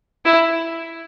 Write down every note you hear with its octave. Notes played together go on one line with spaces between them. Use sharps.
E4